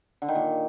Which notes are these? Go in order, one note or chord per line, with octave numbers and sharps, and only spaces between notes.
D3
D#3
A#2